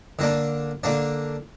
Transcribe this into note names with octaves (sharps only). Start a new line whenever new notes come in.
D3 A#3 D4
D3 A#3 D4